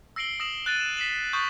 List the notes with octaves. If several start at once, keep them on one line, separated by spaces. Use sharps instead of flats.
E6 A#6 C7 D7 F#7 G7
D#6 E6 A#6 E7 F#7
F#6 A6 D#7
E7
B6 C7 E7 F#7
C#6 D#6 F#6 G6 A6